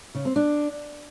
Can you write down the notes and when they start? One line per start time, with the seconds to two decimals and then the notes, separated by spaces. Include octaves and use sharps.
0.15 C#3
0.25 C4
0.36 D4